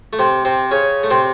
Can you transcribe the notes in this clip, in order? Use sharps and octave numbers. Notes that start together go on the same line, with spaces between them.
A3
C3 C4
C3 C4
C#3 C#4
A3
C3 C4